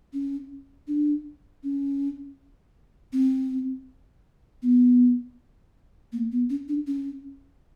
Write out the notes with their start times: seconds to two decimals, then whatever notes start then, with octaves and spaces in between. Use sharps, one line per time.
0.13 C#4
0.88 D4
1.63 C#4
3.13 C4
4.62 B3
6.12 A#3
6.32 B3
6.50 C#4
6.68 D4
6.87 C#4